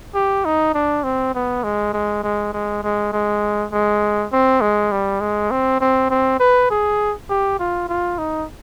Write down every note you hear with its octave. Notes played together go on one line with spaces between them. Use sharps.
G4
D#4
D4
C4
B3
G#3
G#3
G#3
G#3
G#3
G#3
G#3
C4
G#3
G3
G#3
C4
C4
C4
B4
G#4
G4
F4
F4
D#4